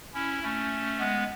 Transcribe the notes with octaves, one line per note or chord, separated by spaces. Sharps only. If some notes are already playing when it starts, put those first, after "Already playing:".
C#4 E4
A3 C#4
G#3 B3